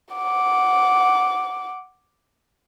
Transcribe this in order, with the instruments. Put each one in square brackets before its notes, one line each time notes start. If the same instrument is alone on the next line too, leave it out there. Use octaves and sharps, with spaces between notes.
[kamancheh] F#5 D6